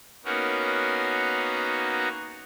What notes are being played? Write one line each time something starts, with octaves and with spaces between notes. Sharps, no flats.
A#3 B3 C#4 D#4 F#4 A#4